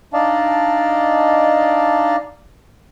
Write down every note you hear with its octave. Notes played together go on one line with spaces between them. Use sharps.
D4 D#4 D5 D#5 F5 A5